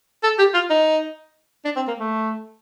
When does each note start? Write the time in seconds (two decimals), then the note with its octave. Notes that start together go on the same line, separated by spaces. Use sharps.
0.23 A4
0.39 G4
0.54 F4
0.70 D#4
1.65 D4
1.76 C4
1.88 A#3
1.99 A3